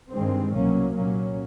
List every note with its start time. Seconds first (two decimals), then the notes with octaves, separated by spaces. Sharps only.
0.12 G2 D#3 G#3 C4
0.53 C2 B2 F#3 A#3 C#4
0.95 C2 A#2 F#3 A#3 C#4